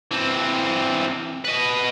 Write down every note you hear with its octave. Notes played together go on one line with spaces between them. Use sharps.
E3 C4
B4 D#5